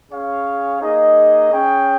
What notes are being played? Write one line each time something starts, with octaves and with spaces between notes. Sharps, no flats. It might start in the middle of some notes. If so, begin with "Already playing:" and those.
C#4 G#4 C#5 F5
A#3 D#4 G#4 D#5
C#4 G#4 C#5 G5